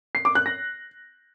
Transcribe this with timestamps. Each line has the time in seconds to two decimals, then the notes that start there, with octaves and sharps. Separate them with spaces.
0.15 C7
0.25 D6
0.35 F#6
0.46 A#6